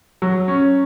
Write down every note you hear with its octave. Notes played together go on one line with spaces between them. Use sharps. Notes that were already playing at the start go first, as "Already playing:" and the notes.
F#3
C#4